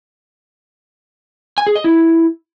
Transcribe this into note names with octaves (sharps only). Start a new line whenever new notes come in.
G#5
G#4
D#5
E4